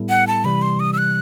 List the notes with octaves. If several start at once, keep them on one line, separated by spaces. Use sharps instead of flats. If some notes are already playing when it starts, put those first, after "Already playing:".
Already playing: A2 G3 B3 E4 A4
F#5
A5
C3 E3 G3 B5
C6
D#6
E6
F#6